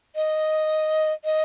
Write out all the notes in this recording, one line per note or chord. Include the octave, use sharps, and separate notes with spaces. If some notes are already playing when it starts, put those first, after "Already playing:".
D#5
D#5